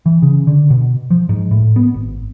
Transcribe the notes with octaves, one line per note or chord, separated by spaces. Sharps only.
E3
C#3
D3
B2
F3
G#2
A2
B3
G#1